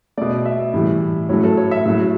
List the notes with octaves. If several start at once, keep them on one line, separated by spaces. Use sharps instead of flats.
B2 A3 D5
E5
A2 E3 G3
A2 F#3 A3 C#5
A4
C#5
E5
A2 F#3 A3 E5